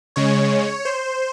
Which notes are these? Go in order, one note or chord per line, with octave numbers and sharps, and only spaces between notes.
C#3 G#3 C#5
C5